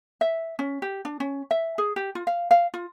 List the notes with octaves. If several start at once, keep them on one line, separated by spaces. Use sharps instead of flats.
E5
C#4
G4
D4
C#4
E5
G#4
G4
F4
F5
F5
F4